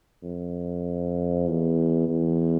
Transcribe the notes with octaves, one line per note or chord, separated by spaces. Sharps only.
F2
E2
E2